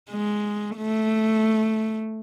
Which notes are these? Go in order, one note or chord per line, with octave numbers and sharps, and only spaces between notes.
G#3
A3